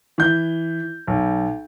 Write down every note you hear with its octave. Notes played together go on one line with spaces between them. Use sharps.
E3 G6
B1